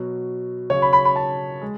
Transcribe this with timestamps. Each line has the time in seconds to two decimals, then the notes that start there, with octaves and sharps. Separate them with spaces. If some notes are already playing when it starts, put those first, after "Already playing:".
Already playing: B2 F#3
0.70 C#3 F#3 C#5
0.82 B5
0.93 B5
1.05 B5
1.16 A5
1.62 G#3